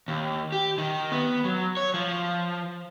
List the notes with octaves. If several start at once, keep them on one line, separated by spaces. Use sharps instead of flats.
D#2
G4
D#3
B3
F#3
C#5
F3